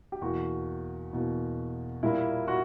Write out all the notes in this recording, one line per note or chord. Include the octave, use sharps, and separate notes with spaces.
G4
E2 B2 A#3 F#4
E2 B2 A#3
A#2 G3 A#3 E4
F#4